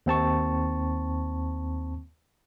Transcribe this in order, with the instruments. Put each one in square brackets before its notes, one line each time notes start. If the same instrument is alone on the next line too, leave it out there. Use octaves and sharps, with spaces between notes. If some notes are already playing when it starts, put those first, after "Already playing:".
[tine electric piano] D#2 C4 A5 C#6